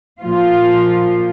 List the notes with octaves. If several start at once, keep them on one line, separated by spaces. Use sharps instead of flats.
A#2 F3 F4